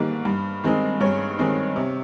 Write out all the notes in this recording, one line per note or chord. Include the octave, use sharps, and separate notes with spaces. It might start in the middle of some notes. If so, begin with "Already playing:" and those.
Already playing: G#2 D#3 G3 A#3
G2
D#3 G#3 C4 D#4
G2 C#5
D#3 G#3 C4 D#4
C3